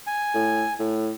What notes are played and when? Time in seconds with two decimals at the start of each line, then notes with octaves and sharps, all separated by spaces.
0.07 G#5
0.34 A2
0.79 A2